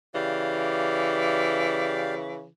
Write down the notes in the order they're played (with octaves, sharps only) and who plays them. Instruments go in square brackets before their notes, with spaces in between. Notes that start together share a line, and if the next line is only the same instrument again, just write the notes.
[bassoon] C#3 [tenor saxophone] E3 [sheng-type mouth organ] G4 D5 F5